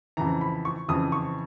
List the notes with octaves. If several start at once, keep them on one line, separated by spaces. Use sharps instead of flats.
F2 C#3 E3 A#5
B5
C#6
F2 C#3 E3 D#6
C#6